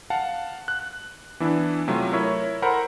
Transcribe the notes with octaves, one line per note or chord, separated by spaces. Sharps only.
F5 F#5 A5
F#6
E3 B3 D4 E4
C3 F#3 A3 F4
E4 A#4 C#5 E5 C#6
A4 A#4 C5 F#5 B5